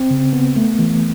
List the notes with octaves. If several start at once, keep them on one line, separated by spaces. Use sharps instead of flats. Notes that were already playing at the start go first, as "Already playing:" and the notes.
Already playing: C4
C#3
B3
A3
E3